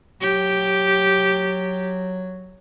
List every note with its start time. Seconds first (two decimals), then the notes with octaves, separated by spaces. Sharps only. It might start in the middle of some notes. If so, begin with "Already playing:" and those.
0.21 F#3 G4